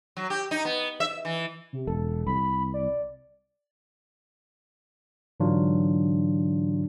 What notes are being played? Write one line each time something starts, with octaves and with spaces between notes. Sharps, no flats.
F#3
G4
D#4
B3
E5
E3
C3
E1 A4
C2 B5
D5
G#2 D3 E3 F#3 D4 F4